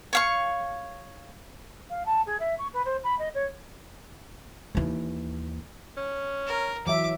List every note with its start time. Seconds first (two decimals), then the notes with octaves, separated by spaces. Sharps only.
0.13 C#5 F5 C#6
1.89 F5
2.05 A5
2.26 G#4
2.39 E5
2.58 C#6
2.73 B4
2.85 C5
3.03 B5
3.18 D#5
3.34 C#5
4.75 D#2 E3
5.97 C#4
6.47 A#4
6.87 E3 F#3 E5 D6